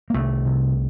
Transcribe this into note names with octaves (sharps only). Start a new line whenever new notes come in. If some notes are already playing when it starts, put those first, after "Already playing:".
A#3
C2 A3
C3